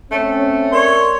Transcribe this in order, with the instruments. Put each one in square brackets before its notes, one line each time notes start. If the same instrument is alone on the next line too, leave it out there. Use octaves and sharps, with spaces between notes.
[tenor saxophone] A3 [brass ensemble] C4 C#4
[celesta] A#4 D5 [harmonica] C#5 C6